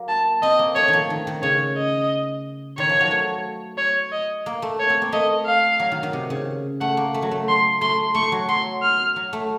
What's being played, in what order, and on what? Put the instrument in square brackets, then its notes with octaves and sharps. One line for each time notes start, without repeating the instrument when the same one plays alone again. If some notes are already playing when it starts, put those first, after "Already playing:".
Already playing: [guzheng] F#3 A#3
[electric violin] A5
[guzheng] C4 [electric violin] D#5
[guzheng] A#3
[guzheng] A3 [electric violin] C#5
[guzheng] D#3 F3
D#3
D#3
[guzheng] C#3 [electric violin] C#5
[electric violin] D#5
[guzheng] D#3 [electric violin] C#5
[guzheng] F3
F#3
A3
[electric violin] C#5
D#5
[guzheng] A#3
A3
[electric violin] C#5
[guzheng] C4
A#3
[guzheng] A3 [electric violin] D#5
[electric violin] F5
[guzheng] F#3
D#3
D#3
C3
C#3
[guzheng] A3 [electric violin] F#5
[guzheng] A#3
A3
F#3
A3
[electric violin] C6
[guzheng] A3 [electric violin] C6
[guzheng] A3 [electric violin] C#6
[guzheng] F#3
[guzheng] F#3 [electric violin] C6
[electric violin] F6
[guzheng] F#3
A3